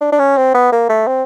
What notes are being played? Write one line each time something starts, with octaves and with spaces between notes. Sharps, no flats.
D4
D4
C#4
C4
B3
A#3
A3
C4